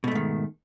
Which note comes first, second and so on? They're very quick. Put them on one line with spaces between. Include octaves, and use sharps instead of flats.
B2 A3 G#2 D#3